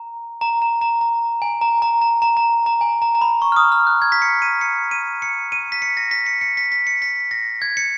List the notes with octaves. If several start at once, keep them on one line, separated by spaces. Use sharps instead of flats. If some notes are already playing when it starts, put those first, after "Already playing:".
Already playing: A#5
A#5
A#5
A#5
A#5
G#5
A#5
A#5
A#5
A#5
A#5
A#5
G#5
A#5
A#5
B5
C#6
F6
D#6
F6
F#6
G#6
B6
C#7
D#7
C#7
D#7
C#7
D#7
B6
C#7
A#6
B6
C#7
C#7
B6
B6
C#7
B6
A#6
G#6
C#7